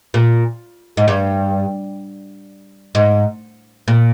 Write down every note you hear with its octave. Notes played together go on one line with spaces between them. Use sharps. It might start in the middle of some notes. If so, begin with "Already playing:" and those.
A#2
G#2
G2
G#2
A#2